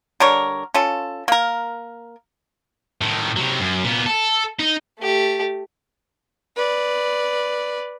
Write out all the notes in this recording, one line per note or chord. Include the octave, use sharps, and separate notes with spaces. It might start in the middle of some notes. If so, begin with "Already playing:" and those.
D3 G3 A#4 C#5
C#4 F4 A4
A#3 A#4
A2 D#3
C3 F#3
F#2
A#2 B3
A4
D#4
A3 G4
B4 D5